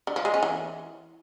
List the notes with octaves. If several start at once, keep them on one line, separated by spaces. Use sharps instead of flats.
D3
F3
G#3
C#4
E3